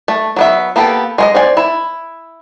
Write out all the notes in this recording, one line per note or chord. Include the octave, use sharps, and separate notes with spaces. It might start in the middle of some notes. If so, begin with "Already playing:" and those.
A3
F#3 B3 E5
A#3 B3 G4 A4
G#3 C5 D#5
C4 D5 G#5
E4